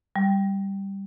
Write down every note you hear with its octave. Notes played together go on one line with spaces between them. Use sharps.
G3